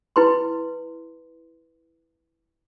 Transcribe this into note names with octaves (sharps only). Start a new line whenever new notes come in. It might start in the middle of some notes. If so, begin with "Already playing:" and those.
E4 B4 C6